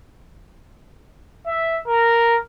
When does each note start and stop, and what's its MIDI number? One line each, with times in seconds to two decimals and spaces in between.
1.46 1.79 76
1.86 2.37 70